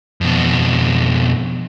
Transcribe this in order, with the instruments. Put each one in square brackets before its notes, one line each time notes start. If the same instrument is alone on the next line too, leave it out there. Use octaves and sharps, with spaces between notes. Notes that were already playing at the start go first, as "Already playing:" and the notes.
[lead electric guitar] F2 B2